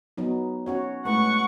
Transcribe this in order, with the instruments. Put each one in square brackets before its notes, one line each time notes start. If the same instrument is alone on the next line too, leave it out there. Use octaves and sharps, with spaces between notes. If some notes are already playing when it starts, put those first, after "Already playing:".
[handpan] F#3 B3 D#4
C#4 F#4 C#5
[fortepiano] A2 [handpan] G#3 B4 [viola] F#5 [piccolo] C#6